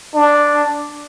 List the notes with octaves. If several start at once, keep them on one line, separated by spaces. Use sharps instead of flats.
D4